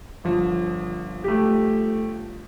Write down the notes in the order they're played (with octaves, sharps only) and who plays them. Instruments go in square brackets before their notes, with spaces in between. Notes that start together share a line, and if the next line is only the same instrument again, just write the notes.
[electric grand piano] G1 F3
[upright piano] A3 G4